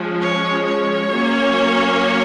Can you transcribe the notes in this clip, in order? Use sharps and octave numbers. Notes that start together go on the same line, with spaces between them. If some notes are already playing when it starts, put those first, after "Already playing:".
Already playing: F3 G#3 C#4
C#5
C#5
F#3 A#3 C#4